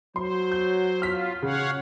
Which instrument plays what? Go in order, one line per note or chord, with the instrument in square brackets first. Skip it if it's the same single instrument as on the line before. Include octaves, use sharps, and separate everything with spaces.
[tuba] F#3 [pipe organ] C5 [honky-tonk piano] C6
[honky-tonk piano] G6
[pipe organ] F4 [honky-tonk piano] F6 B6
[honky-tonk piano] C#3 [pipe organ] C#5 F5 F#5